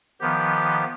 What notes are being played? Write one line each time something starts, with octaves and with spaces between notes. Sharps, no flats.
D#3 F3 B3 G4